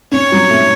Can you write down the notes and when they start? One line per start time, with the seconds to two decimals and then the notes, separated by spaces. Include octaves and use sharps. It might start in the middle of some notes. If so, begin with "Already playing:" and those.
0.12 C#4 C#5
0.32 F#3
0.50 A3